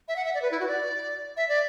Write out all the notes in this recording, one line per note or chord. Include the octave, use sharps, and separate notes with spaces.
E5
F#5
E5
D5
B4
E4
F#4
D5
E5
D5